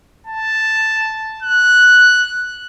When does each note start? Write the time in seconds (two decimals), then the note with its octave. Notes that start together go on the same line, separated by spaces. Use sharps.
0.27 A5
1.42 F#6